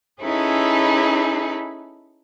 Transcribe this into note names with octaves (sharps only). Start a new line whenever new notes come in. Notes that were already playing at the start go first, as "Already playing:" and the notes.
C#4 D#4 E4 G#4 A4 B4